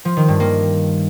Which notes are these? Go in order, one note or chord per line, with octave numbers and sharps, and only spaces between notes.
F3
D#3
G2
A#3